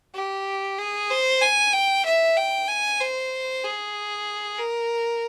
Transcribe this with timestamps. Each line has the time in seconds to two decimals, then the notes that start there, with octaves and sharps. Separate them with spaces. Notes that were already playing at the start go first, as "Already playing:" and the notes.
0.15 G4
0.79 G#4
1.11 C5
1.42 G#5
1.73 G5
2.05 E5
2.37 G5
2.68 G#5
3.00 C5
3.64 G#4
4.58 A#4